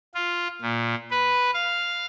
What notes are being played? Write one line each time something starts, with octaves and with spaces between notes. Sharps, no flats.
F4
A#2
B4
F5